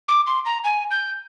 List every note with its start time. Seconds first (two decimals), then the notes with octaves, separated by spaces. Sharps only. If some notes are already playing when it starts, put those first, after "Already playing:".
0.08 D6
0.27 C6
0.46 A#5
0.64 G#5
0.91 G6